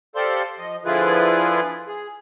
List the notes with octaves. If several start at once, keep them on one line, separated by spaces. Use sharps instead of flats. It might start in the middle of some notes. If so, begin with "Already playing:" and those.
G4 A4 C5 D5 F5 C6
F3 D#5
D3 F3 E4 F4 G#4 B4
G#4